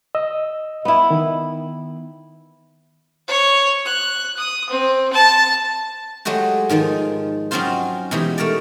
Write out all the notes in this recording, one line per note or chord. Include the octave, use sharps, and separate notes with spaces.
D#5 E6
B3 E4
D#3
C#5
F#6
D#6
C4
A5
F#3 G#3 A3 F#4 G4
G#2 D#3 F3 D#4
F#3 C4 C#4 D#4 F4 C5
B2 E3 G#3 D#4 G4
A3 A#4 C#5 D5